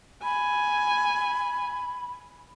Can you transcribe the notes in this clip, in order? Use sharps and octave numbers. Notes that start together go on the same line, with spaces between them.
G#5 B5